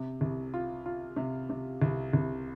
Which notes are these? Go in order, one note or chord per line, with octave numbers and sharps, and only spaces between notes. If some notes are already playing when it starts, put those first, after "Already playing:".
Already playing: C3
C2
F4
F4
C3
C3
C2
C2